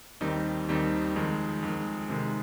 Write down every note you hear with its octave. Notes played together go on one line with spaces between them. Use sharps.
D#2 D#3 G3 C4 D#4
D#2 D#3 G3 C4 D#4
F2 D#3 G#3
F2 D#3 G#3
C3 D#3 G#3